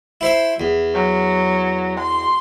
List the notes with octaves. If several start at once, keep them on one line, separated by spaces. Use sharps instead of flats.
E4 C5 E5
E2
F#3
C6